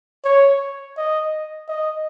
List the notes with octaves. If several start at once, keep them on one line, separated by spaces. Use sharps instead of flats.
C#5
D#5
D#5